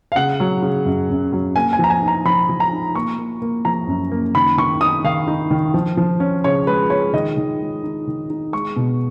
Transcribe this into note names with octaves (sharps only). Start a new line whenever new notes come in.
F5
C#3 F#5
F#3
C#3
F#2
F#2
F#3
A#3 G#5
G#5
F3 A#5
G#5
D#4 A#5
F3 B5
F3
A#5
D#4
A#3 C#6
A#3
A#3
F3 A#5
F#2
A#3
D#3 B5
D#3 C#6
D#4 D#6
D#3 F5
D#4
D#3
F3
F3
C#4
C#3 C#5
G#3 B4
G#3 C#5
D#3 D#5
D#3
G#3
D#4
D#3
D#4
G#3 C#6
B2